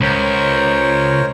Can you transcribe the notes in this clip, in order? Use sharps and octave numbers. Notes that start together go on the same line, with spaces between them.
C#2 A#4 C5 C#5